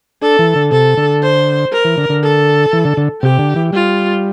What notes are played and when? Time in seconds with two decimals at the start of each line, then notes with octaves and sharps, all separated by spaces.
0.22 D4 A4
0.39 E3
0.56 D3
0.71 C3 A4
0.97 D3
1.22 C5
1.72 A#4
1.85 E3
1.97 D3
2.09 D3
2.23 A4
2.73 E3
2.85 D3
2.97 D3
3.22 C3 G4
3.39 D3
3.56 E3
3.72 G3 F4